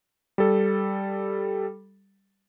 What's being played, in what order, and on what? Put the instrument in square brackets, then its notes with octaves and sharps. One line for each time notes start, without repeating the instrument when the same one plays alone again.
[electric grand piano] G3 A4